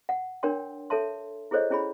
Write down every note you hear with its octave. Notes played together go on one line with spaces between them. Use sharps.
F#5
D4 A#4 C#5 G5 C6
A4 C#5 E5 A5 C6
E4 G#4 A4 C5 C#5 D#5
C#4 E4 G#4 C#5 B5